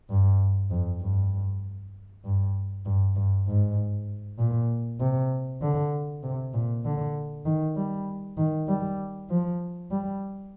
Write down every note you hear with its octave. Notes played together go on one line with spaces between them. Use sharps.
G2
F2
G2
G2
G2
G2
G#2
A#2
C3
D3
C3
A#2
D3
D#3
G3
D#3
G3
F3
G3